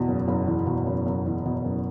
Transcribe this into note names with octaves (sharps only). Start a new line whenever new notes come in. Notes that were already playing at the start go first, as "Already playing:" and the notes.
Already playing: E2 B2
F#1
F#1
E2
B2
F#1
F#1
E2
B2
F#1